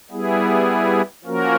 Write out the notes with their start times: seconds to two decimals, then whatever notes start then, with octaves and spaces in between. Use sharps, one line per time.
0.11 G3 B3 E4 G#4
1.24 F3 A#3 C#4 F#4 A#4